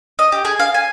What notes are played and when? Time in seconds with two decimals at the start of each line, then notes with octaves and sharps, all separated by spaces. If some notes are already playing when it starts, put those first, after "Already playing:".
0.19 D#5
0.32 G4
0.45 G#4
0.60 F5
0.74 G#5